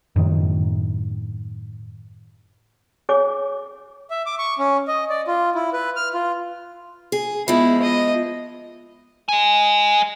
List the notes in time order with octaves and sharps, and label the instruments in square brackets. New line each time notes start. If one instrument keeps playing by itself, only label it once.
[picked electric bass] F#2 A2 D#3
[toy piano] G#4 C#5 G#5 D6
[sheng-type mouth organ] E5
D6
C#6
C#4
D#5
D5
F4
E4
B4
F6
F4
[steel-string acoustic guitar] G#4
[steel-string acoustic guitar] F3 G#3 [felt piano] B3 [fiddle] E4
[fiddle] D#5
[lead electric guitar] D#5 G#5